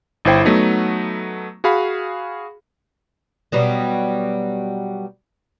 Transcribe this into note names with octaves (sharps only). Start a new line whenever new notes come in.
G1 E4 C5 G5
F#3 A3 B3 D#4
F#4 G#4 F5 B5
B2 F#3 G3